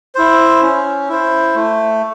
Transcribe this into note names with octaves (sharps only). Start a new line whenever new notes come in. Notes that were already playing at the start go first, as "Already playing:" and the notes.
E4 C5
C#4
E4 C5
A3